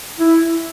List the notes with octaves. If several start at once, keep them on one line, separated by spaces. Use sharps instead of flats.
E4